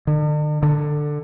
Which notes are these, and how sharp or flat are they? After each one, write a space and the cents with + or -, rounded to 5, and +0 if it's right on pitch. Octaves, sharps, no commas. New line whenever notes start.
D3 +45
D3 +15